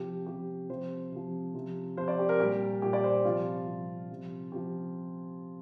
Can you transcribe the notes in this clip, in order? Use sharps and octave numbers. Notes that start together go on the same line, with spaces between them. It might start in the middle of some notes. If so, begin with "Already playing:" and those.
Already playing: C3 F3 G4
C3 F3 G4
C3 F3 C5
C3 F3
C3 F3
C3 F3 C5
D5
G4
A#4
A#2 G3 G4
A#2 G3 G4
D5
C5
C3 F3 F4
C3 F3
C3 F3
C3 F3 G4